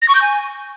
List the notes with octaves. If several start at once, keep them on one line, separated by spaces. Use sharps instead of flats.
A#6
C#6
G6
G#5